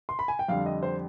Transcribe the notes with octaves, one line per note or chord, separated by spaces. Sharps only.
C6
B5
G#5
G5
F2 D3 G3 F5
D#5
C5